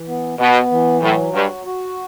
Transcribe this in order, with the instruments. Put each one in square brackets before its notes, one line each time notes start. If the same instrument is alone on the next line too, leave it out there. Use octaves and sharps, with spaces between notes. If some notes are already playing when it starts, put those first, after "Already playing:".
Already playing: [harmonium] E3
B3
[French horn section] B2 [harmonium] B3
[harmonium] E3
[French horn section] A2 [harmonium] F#3
[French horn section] G2 [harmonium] F#4
[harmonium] F#4